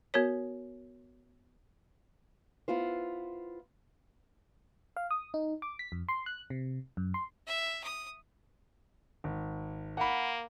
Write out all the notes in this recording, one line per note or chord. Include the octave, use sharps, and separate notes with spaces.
B3 F#4 A#4 C#5
B3 E4 F4 C5
F5
D#6
D#4
D6
B6
F2
C6
F#6
C3
F#2
C6
E5
D#6
G#1
A#3 F#5 B5